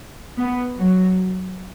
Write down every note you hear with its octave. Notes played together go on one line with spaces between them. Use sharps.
B3
F#3